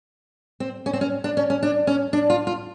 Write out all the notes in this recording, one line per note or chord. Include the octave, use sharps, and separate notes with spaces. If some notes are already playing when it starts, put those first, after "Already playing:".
C4
C#4
C4
C#4
D4
C#4
C#4
D4
C#4
D4
F4
F4